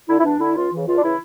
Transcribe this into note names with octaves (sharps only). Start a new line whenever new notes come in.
D3 E4
E4
E2 D4
D3 E4
C#2 F4
C#3 E3
C#2 F4
D4
C#3 E3 E4